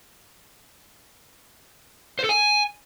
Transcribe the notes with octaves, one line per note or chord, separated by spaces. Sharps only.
C5
A4
G#5